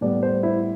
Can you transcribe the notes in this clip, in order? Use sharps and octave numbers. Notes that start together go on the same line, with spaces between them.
A2 G3 B3 D5
C5
E4